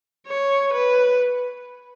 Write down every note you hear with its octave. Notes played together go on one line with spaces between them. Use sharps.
C#5
B4